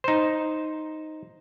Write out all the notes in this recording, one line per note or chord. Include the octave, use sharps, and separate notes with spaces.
D#4 C5